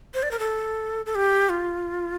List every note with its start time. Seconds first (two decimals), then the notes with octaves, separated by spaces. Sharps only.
0.14 C5
0.23 D5
0.31 A#4
0.39 A4
1.06 A4
1.15 G4
1.49 F4